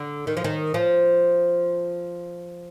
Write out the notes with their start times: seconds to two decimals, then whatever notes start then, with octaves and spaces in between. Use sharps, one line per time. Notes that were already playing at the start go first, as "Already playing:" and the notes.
Already playing: D3
0.27 D#3
0.37 F3
0.44 D#3
0.74 F3